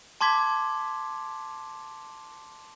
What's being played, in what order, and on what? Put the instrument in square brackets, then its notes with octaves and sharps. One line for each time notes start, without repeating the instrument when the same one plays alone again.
[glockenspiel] A5 C6 D6 G#6 B6